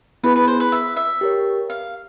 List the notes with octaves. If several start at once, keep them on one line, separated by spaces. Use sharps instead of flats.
B3 E4 G#4 B4
B4
C5
B4
E5
E5
G4 A#4 C#5
F5